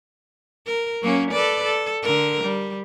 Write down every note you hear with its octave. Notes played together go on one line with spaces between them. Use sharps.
A#4
F#3 A#3 C#4
A4 B4 D5
A4
D3 A#4
G3